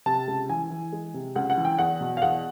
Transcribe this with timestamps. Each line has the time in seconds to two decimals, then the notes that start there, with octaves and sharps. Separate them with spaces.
0.06 C3 A5
0.27 C#2
0.49 E3 G#5
0.70 E3
0.93 G#3
1.14 C3
1.35 C#2 F#5
1.50 F#5
1.57 E3
1.65 G5
1.78 E2 F#5
2.01 B2
2.17 F5
2.22 E2 F#5